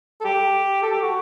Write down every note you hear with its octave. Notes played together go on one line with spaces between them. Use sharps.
A4
G4
A4
G4
F#4